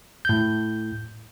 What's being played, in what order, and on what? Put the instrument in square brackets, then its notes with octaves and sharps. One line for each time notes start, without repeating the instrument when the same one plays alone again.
[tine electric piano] A2 G6